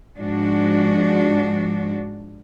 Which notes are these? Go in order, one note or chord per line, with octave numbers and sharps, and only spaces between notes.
G#2 F3 G#3 D4 F#4